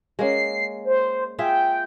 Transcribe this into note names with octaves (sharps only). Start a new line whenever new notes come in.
G#3 A#3 C#4 C7
C5
F4 G#4 E5 G5